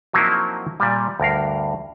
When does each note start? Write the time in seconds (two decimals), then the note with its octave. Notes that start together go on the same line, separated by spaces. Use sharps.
0.13 F3 F#3 A#3 C4 D#4 E4
0.80 A#2 G3
1.20 D2 G2 A#4 F5